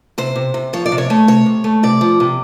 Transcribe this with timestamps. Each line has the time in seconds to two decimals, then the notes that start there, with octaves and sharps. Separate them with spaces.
0.18 C3 C5
0.36 C3
0.54 C3
0.73 F3 C#5
0.86 D5
0.92 C3
0.98 C#5
1.10 A3
1.28 C3 C#5
1.46 C3
1.64 A3
1.83 C3 D5
2.01 F3
2.20 C3